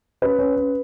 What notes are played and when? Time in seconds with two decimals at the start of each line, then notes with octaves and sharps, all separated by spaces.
0.22 C#4 B4
0.39 C#4
0.57 C#4